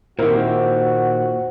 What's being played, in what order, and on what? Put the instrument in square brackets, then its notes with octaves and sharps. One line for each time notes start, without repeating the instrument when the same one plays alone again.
[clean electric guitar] A#2 D#3 [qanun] C4 G4 [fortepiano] E4 A#4 C5 [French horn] F#4